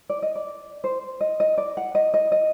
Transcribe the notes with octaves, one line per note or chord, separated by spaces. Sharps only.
D5
D#5
D5
C5
D#5
D#5
D5
F#5
D#5
D#5
D#5